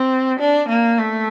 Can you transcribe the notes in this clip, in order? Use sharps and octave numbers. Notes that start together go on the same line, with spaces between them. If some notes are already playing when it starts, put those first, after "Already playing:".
Already playing: C4
D4
A#3
A3